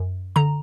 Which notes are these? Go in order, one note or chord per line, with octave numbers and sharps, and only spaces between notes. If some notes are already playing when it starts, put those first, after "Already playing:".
Already playing: F#2
D3 A#5